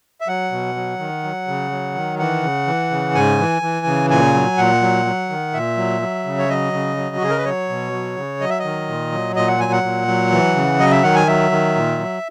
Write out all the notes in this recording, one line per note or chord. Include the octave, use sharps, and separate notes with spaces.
E5
F#3 F#5
B2
F#3
D#3
F#3
C#3
F#3
D#3
E3 F#5
C#3
E3
C#3
G#2 G#5
E3
E3
C#3
A#2 G#5
F#3
A#2 F#5
F#3
F#3
D#3
A#2 E5
F#3
F#3
C#3
C#5
F#3 D#5
C#3
F#3
F#4
C#3 G#4
A#4
B4
F#3 C#5
B2
F#3
C#3
F#3 D#5
E5
D#5
D#3
A#2
F#3
A#2 D#5
F#5
F#3 G#5
F#5
A#2
F#3
E3
C#3
F#3 D#5
E5
D#3 F#5
G#5
F#3 E5
D#3
A#2
F#3